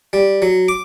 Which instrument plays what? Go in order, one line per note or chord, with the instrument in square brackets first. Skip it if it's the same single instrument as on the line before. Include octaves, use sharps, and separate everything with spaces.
[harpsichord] G3
F#3
D6